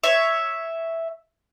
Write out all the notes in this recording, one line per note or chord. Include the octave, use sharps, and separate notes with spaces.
C#5 E5